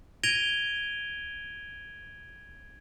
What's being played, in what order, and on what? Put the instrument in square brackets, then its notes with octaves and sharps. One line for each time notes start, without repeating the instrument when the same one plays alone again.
[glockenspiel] G#6 A#6 D7 D#7 F7 G7